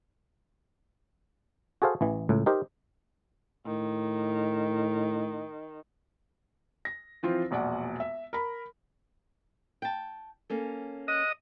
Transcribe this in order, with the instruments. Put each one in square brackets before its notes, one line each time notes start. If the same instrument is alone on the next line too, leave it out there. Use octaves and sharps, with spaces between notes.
[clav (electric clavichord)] F#4 G#4 A4 C5 F5
A1 E3
C#2 A2
D#4 G4 A#4 C5
[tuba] A2 [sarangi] D#3
[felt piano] A#6
E3 F3 C4 F4
E1 A#1 D5 F#5
E5
A#4 B5
[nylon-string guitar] G5 A5
A#3 C#4 A4
[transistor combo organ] D#5 [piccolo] F#6